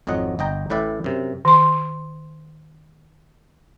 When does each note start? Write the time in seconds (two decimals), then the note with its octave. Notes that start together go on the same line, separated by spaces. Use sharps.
0.07 G#1 F2 F#3 D#5 F#5
0.39 G1 D#5 G5 A#5
0.70 A1 A2 B4 D5 E5 G5
1.04 F#2 C3
1.45 D#3 C6